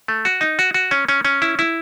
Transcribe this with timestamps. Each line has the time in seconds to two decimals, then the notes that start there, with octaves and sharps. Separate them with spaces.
0.08 A3
0.25 F#4
0.41 D#4
0.59 F#4
0.74 F#4
0.91 C#4
1.08 C#4
1.25 C#4
1.42 E4
1.59 E4